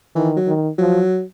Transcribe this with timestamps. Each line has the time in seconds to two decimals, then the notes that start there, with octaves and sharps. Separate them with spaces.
0.15 D#3 E3
0.37 F#3
0.47 D#3
0.78 F3 F#3